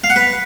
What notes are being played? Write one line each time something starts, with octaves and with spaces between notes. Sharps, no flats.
F5
F#5
B4